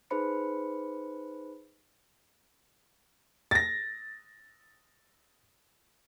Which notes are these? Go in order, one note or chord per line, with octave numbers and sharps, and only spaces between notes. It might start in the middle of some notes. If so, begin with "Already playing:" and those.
D#4 G#4 B4 C5 B5 C#7
A6 A#6